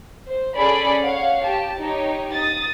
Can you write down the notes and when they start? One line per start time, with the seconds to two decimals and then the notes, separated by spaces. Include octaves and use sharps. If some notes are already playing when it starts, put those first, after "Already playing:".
0.27 C5
0.56 C#4 G#4 A4 D5 B5
1.04 C#5 F5 F#5
1.45 G4 A5
1.80 D#4 G4 C#5
2.35 D#6 A6